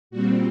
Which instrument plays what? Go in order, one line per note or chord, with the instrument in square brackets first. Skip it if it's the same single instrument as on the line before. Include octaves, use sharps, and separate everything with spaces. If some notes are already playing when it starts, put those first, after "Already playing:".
[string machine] A#2 G3 C4 F#4